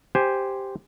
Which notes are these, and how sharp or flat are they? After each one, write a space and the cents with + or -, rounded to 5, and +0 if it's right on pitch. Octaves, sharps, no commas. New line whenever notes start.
G4 +0 C5 +0 G#5 +0